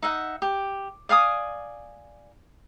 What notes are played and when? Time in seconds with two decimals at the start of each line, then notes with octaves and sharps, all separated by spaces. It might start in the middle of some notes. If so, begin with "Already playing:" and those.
0.03 D#4 E5 F#5
0.42 G4
1.09 D5 F5 G#5 D#6